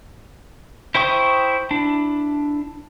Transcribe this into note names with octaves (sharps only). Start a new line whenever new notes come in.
E4 C5 G5 C#6 D#6
D4 E4